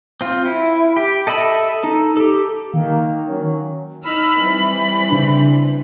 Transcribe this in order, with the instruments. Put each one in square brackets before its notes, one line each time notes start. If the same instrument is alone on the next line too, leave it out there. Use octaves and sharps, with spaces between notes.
[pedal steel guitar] C4 F4
E4
G4
A4 D#5 E5 B5 E6
D#4 A4
G4 A4
[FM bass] D#3 [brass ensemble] A#3 F5
[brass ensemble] F#3 C#4
[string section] D#4 E6 F6 [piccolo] B5
[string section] E3 G3 C4
[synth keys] C#3 D4